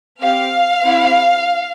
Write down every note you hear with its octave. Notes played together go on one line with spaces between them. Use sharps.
C4 G4 F5
C4 E4 G4